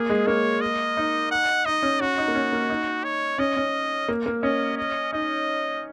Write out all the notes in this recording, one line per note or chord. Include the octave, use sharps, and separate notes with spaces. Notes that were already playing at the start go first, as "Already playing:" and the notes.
Already playing: A#3 G#4
G#3
A#3 C#5
D#5
D#4
F#5
D#4 D#5
C#4
C#4 F#4
D#4
A#3
C#4
A#3
D#4
C#5
C#4 D#5
C#4
A#3
A#3
C#4 D#5
D#5
D#4 D#5